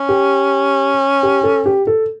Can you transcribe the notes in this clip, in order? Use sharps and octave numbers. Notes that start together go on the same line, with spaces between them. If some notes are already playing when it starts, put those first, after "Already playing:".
Already playing: C#4
G4
G4
A4
G4
A4